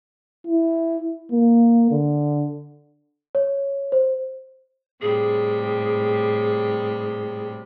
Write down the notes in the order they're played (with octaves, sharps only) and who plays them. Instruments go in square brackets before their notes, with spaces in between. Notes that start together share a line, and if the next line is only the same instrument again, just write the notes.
[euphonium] E4
A#3
D3
[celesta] C#5
C5
[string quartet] A2 C3 G3 [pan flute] G#4